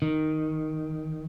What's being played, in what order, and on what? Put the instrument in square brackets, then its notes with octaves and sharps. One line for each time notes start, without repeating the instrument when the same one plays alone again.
[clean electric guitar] D#3